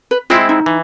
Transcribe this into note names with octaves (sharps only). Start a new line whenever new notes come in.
B4
G#3 C4 E4 F4
D#4
E3